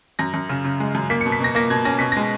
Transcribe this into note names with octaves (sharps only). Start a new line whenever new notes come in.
F#2 A#6
F#2
C#3
C#3
G#3
F#2
A#3 B6
C#7
B2
B6
B2 A#6
A#3 A#6
B2 G#6
C#4 A#6
B2 B6
G#3 A#6